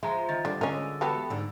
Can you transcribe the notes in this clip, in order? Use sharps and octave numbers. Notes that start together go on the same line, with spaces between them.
F3 G#3 E5 A#5
D#3 A6
D3 G3 D4
D3 G#3 C#4 A#4 D#5
E2 B3 F#4 G4 A4 B4
G#2 D3